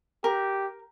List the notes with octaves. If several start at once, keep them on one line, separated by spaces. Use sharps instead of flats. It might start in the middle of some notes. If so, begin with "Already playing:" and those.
G4 A#4